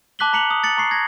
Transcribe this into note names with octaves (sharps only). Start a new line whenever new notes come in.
A5 D6 F#6 B6 F#7 G7
A#5 B6 C#7 F7 F#7
D#6
A6 C#7 F#7
A#5 C#6 C7
G#6 A#6